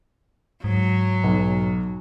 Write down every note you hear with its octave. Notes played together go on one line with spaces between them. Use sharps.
G#2 F#3
B1